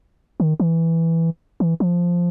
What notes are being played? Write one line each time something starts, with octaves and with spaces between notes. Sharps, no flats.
D#3
E3
E3
F3